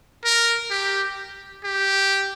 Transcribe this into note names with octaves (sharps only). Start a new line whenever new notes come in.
A#4
G4
G4